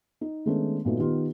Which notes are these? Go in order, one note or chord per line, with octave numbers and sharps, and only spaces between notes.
D#4
D#3 G#3 A3 B3 C#4 D4
A#2 F#3 A3 B3 D#4
D#3 B3 D#4 F4 G4